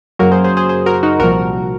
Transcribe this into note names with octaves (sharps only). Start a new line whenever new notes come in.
F#2 C#3 F#3 A#3 F#4 A#4
G#4 C5
G#4 C5
G#4 C5
G#4 C5
F#4 A#4
D#4 F#4
C2 A#2 F3 F#4 A#4